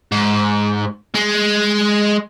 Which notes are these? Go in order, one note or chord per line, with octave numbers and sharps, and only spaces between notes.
G#2
G#3